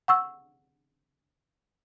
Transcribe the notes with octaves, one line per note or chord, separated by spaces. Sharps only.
F#5 C#6 E6